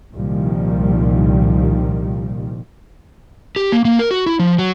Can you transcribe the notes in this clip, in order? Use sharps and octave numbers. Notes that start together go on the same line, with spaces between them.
C2 A#2 D#3 F3 G3
G4
A#3
A#3
A#4
F#4
E4
F3
F#3